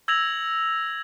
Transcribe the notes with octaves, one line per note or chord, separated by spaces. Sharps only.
E6 G#6 A#6 F7 F#7